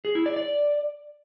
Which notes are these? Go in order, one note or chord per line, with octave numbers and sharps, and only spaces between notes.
G#4
E4
D5
D5